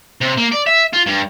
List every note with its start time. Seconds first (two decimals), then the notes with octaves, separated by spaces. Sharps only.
0.21 C3
0.38 A#3
0.52 D5
0.66 E5
0.93 F4
1.06 G2